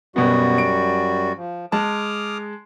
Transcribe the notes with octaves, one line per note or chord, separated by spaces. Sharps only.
F#2 B2 G3 B3 F#4
D7
F3
G#3 A5 D6 D#6 F6